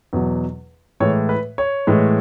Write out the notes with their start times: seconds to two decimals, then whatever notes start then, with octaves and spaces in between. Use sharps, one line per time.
0.13 E2 B2 F#3
1.00 A2 E3 G#3 C#5
1.29 B4
1.58 C#5
1.87 A2 E3 G#3